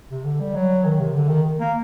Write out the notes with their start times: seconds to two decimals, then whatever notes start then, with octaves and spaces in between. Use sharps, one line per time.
0.10 C3
0.24 D3
0.40 G3
0.55 F#3
0.85 D#3
0.99 C3
1.15 D3
1.28 D#3
1.59 A#3